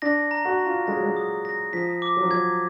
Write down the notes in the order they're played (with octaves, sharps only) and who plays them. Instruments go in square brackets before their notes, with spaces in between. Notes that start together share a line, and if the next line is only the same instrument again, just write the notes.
[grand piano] D4 [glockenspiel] A#6
[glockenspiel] A#5
[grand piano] F#4
[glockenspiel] A#5
[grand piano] F4
[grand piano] G#3 [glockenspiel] A#6
[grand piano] F#3
G#3
[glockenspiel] D#6
A#6
[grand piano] F3 [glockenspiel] B6
[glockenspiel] D6
[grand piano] F#3
F3
[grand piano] F#3 [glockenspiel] G#6